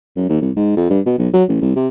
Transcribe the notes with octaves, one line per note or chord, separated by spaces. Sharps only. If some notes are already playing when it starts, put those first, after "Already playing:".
F#2
D#2
C2
G#2
F2
G2
B2
B1
F#3
A1
C2
C3